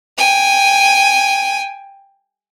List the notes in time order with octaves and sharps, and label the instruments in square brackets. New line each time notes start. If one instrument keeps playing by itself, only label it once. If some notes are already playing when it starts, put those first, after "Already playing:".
[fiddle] G5 G#5